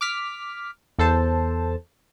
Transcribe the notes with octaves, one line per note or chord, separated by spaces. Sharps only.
D6 F6 B6
E2 A4 C5 A5